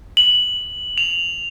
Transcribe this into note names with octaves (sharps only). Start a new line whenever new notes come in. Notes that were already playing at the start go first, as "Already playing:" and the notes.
F#7
F7